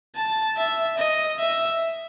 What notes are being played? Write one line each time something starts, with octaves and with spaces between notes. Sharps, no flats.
A5
E5
D#5
E5